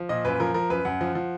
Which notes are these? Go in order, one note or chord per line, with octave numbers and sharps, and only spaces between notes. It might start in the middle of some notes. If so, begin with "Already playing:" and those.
Already playing: F3
A#2 D#5
F#2 B4
F3 A#4
F3 A#4
F#2 B4
F#2 F#5
F3
F3